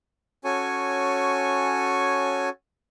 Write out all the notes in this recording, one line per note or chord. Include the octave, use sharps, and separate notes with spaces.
C#4 F#4 A4 C#5 G#5 C#6